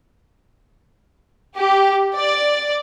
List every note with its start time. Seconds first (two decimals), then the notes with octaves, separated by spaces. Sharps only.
1.56 G4
2.15 D5